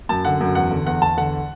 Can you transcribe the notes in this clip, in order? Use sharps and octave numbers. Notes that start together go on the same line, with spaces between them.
F#2 A5
D3 F#5
F#2
E2 F#5
D3
E2 F#5
E2 A5
D3 F#5